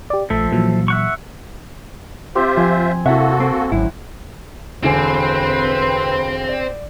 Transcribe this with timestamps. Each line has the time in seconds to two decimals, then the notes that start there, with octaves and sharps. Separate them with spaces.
0.10 G4 D5
0.30 A#1 F3 A3 A4 E5
0.52 A#2 E3 F#3
0.88 E5 F#5 C#6
2.35 C4 F4 G4 C5 E5
2.57 F3 G#5 C6
3.06 C3 A#3 E4 F#4 A4 E5 F#5
3.40 C4
3.72 G#1 F#2 A2 D3 E4
4.83 E1 D3 C4 B4 C5 G#5
6.49 D5